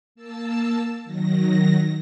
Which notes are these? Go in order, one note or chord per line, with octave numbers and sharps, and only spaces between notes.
A#3 A5 E6
D#3 F#3 A#6